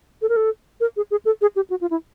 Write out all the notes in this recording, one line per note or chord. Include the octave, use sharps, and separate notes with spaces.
A4
A#4
A4
A#4
G#4
G#4
A4
G#4
G4
F#4
F4
E4